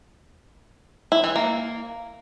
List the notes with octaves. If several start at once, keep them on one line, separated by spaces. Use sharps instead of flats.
E4
E3
A#3